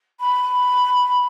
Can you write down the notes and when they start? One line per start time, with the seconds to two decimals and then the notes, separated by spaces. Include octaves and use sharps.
0.20 B5